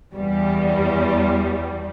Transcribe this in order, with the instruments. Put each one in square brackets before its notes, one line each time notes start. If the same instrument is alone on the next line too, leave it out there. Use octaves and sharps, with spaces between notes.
[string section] E2 G3